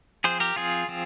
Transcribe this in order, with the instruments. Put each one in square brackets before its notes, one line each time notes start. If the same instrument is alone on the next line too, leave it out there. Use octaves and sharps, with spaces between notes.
[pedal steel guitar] F3 C4 G#4 C5
G4 A#4
F3 C4 F4 G#4
F3 C4